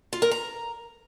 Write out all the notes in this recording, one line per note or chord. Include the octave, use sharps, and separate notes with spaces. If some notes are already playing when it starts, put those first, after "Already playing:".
F4
A#4
A#5